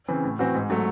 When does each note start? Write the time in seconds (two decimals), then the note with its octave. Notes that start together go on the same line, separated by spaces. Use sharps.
0.08 C#3 E3 C4
0.24 A2
0.39 E3 C4 F#4
0.54 G#2
0.70 F#3 A3